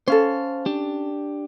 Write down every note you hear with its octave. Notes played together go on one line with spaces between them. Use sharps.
C#4 A4 C5 F5
D4 G4